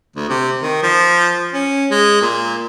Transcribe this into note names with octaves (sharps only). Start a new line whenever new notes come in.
D2
C3
D#3
F3
C#4
G#3
A#2